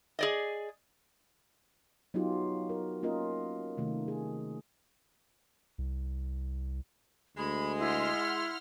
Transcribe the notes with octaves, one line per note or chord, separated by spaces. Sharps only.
G#4 D5 D#5
F#3 B3 D#4 F4 G4
A#4
A#3 C#4 F4 A#4 D#5
C3 D#3 A3
G#4
C2
D2 G#3 B5
E4 F#5 C6 F6